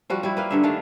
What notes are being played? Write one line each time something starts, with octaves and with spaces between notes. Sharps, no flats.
F3 G3 F#4
G3 E4
A#3 B4 F5
G2 D3 E5
D#3 A3 D4 F5